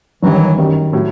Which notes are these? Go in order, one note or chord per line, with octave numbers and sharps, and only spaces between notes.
G1 G2 D#3 E3 F#3
F#2 D#3 G3
A2 F#3